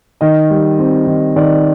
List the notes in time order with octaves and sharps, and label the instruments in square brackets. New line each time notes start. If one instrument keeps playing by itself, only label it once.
[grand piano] D#3 D#5
G3
C4
D#3
D#3 D5